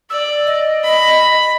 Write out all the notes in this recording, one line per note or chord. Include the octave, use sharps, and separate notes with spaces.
D5 E6
D#5
B5